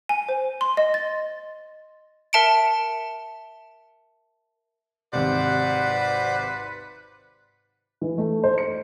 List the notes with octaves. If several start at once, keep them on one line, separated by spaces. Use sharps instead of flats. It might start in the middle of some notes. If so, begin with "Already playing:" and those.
G#5
C5
C6
D#5
A6
A#4 E5 A5 C#7 D7
G#1 D#2 C3 B4 C5 D5 F#5
E3
A3
C5
C#7